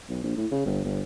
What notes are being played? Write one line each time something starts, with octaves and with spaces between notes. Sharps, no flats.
B1
A#1
A2
C#3
G1
G1